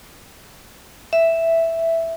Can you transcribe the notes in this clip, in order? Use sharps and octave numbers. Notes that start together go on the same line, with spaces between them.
E5